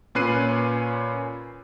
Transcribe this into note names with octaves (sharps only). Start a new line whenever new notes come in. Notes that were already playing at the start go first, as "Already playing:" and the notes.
A#2 C#4 B4 F#6 C7 D#7